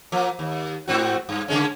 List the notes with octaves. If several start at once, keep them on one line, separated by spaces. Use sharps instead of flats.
F3 A#3
D#2
G#2 C4 F#4
G2
C#3 G#3 C#4